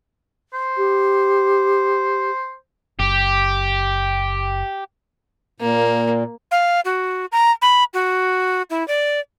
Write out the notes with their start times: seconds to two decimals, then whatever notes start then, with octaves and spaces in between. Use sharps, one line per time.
0.53 C5
0.78 G4
2.99 F#1 G4
5.60 A#2 A#3
6.51 F5
6.85 F#4
7.32 A#5
7.62 B5
7.94 F#4
8.70 E4
8.88 D5